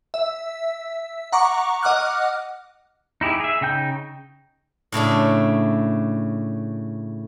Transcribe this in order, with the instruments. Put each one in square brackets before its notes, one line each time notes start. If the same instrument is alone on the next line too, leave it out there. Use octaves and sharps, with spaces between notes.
[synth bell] E5
F#5 A#5 C#6 D6
D#5 F#5 D6 F6 F#6
[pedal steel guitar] D#4 E4 G4 G#4
G#4 E5
C#3 D#4 G5 G6
[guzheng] A2 C#3 A3 D4